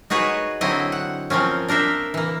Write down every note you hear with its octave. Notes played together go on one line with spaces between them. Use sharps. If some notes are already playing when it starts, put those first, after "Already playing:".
D#4 F#4 G#4 B4 C#5
D3 F#3 C4 E4 D#5
F#5
F3 A#3 C4 C#4
D4 A#4 C5 E5
E3 A#3